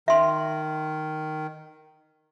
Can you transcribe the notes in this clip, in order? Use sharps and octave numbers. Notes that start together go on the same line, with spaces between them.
D#3 E5 C6